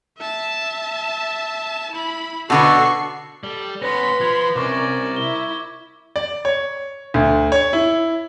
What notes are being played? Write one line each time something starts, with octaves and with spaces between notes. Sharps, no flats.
E5 A5
E4 B5
B2 D3 B3 F#4 A4 C#6 C7
G3 A4
B3 C#4 B4 B5 C6 A#6
F3 G#6
C2 C#4 A#4 D5 C#6 D6
E4 G7
D5
C#5
D2
C#5
E4